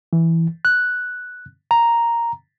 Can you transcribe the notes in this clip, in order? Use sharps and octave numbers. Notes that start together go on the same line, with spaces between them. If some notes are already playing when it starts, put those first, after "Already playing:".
E3
F#6
A#5